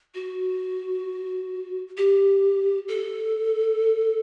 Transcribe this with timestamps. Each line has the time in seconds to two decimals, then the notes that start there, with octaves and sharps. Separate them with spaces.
0.15 F#4
1.97 G4
2.88 A4